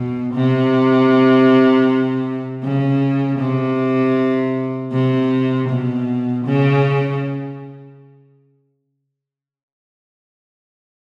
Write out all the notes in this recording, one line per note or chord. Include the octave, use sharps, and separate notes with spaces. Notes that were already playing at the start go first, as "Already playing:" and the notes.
Already playing: B2
C3
C#3
C3
C3
B2
C#3